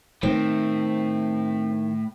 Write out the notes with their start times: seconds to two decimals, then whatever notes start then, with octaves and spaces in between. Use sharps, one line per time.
0.23 A2 D#3 C4